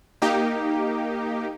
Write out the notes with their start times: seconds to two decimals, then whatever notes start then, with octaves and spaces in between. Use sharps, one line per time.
0.22 A#3 D#4 G4